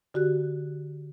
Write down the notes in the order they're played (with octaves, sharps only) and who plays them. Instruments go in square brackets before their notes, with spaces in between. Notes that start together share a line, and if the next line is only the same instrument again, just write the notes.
[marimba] D3 F#4 G4 F#6